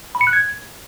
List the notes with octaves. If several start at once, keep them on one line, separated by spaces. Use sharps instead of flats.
B5
C#7
F#6
G#6